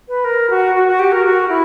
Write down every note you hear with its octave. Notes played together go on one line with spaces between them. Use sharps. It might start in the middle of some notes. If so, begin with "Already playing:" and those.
B4
A#4
F#4
F#4
F#4
G4
A#4
F#4
E4